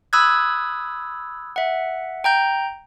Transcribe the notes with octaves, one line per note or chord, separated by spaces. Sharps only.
B5 D#6 E6 F#6 G#6
E5 F#5
G5 A#5 G6